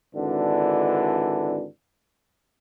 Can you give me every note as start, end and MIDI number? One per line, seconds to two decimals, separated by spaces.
0.14 1.64 32
0.14 1.64 50
0.14 1.64 52
0.14 1.64 62